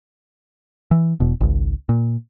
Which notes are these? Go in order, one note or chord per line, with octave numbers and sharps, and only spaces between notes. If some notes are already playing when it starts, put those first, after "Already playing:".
E3
E1 B2
G#1 C#2
A#2